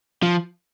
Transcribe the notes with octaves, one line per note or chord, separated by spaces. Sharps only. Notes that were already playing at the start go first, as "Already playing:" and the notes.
F3